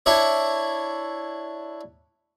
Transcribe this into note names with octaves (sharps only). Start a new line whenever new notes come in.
D4 E4 C#5